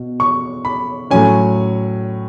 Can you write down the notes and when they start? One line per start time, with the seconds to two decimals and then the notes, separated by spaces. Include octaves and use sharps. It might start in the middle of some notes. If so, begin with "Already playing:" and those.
Already playing: B2
0.20 C#6
0.65 B5
1.10 A2 F#3 C#4 G#5